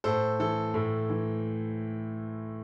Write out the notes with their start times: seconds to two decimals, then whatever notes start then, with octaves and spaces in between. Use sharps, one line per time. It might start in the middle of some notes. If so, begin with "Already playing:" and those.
0.04 A2 A4 C5
0.40 E3 A4
0.74 A2 A4
1.10 E3